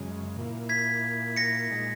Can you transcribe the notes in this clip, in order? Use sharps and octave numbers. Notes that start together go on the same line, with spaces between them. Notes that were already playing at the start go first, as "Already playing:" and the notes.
Already playing: F#2 C#3 G#3
A#2 A#3 E4
G#6 B6
A#6 C#7
A#2 G#3 D#4